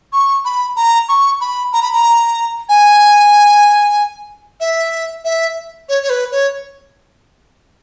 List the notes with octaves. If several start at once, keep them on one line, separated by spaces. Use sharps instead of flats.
C#6
B5
A#5
C#6
B5
A#5
B5
A#5
G#5
E5
E5
C#5
C#5
B4
C#5